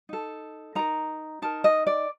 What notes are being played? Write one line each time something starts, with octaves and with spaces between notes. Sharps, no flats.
D#4 A4
D#4 A#4 A#5
D#4 A#4 A5
D#5
D5